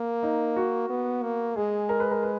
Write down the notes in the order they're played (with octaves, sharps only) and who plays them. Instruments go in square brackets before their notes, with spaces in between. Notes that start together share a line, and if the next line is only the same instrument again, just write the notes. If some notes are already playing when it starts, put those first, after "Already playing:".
Already playing: [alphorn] A#3
[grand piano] D#4
F#4
[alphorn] B3
A#3
[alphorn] G#3 [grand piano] G#4
[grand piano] A#4
B4
A#4
B4